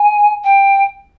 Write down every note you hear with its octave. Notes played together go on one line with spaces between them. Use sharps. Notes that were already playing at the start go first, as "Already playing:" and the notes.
Already playing: G#5
G5